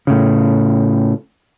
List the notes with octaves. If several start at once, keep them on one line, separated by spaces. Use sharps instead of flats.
A2 C#3